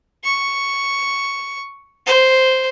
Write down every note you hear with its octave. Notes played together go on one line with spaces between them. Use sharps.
C#6
C5